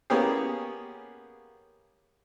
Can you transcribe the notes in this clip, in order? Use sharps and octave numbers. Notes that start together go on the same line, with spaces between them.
A#3 B3 C#4 G4 G#4